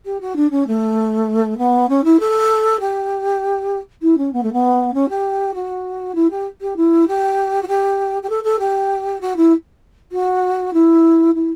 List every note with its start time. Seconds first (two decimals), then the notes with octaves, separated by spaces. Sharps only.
0.05 G4
0.20 F#4
0.36 D4
0.51 C#4
0.67 A3
1.58 B3
1.89 C#4
2.04 E4
2.19 A4
2.80 G4
4.02 E4
4.17 C#4
4.33 B3
4.43 A3
4.52 B3
4.94 C#4
5.09 G4
5.54 F#4
6.15 E4
6.30 G4
6.61 G4
6.76 E4
7.07 G4
7.62 F#4
7.67 G4
8.22 G4
8.29 A4
8.44 A4
8.59 G4
9.21 F#4
9.36 E4
10.12 F#4
10.73 E4
11.35 E4